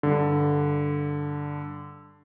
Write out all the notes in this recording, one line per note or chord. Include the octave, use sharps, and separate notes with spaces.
G2 D3